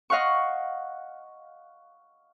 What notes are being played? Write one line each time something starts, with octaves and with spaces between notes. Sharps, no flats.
D#5 F5 F#5 C#6